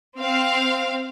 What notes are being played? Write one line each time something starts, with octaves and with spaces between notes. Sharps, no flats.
C4 F5